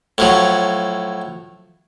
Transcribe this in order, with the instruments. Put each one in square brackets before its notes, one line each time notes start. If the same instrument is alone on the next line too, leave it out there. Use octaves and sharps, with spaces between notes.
[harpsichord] A2 F3 F#3